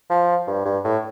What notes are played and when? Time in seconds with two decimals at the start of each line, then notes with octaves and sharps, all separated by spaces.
0.10 F3
0.47 G2
0.65 G2
0.84 A2